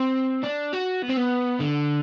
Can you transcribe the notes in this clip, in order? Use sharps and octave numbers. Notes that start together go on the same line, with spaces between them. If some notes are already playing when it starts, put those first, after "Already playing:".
Already playing: C4
D4
F#4
B3
C4
B3
D3